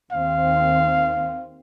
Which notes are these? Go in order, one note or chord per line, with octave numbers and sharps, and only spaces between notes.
D#2 D#3 C4 F5